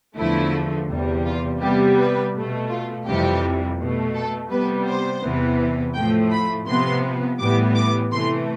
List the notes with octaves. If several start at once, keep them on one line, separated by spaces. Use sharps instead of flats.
E2 D3 F3 A3 E4
E2 C3 G3
F4
C3 G3 B3 G4
B4
B2 A3
F4
F2 C3 E3 G3 G4
B2 A3
A4
C3 G3 B3 B4
C5
E2 C3 E3 B3
A2 F3 A3 G5
B5
C3 F3 B3 C6
A2 E3 G3 B3 D6
D6
C3 E3 A3 C6